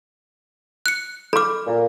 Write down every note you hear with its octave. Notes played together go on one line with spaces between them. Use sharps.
F#6 C#7
A4 B5 D6 F6
A#2